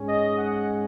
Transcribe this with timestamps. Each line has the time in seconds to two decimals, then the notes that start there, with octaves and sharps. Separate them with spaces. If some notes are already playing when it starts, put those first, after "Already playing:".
Already playing: G#2 G#3 C#4
0.09 D#5
0.38 F#5